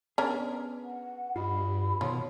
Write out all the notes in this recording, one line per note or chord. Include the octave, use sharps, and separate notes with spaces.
B3 C#4 D4 G#4 A#4
F#5
G2 F4 F#4 D#5 B5
B2 D#3 F3 B3 C#5